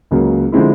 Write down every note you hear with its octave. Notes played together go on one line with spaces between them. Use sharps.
C#2 C#3 F#3 A#3
D3 F3 G#3 C4 E4